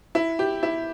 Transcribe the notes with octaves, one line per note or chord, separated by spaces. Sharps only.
E4
G4
E4